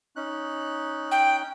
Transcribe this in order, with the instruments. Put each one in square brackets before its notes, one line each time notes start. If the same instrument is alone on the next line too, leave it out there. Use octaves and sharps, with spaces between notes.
[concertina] C#4 D#4 F#6
[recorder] G5